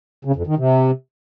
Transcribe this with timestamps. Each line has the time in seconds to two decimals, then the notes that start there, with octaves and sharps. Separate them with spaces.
0.25 C#3
0.36 F2
0.47 D#3
0.58 C3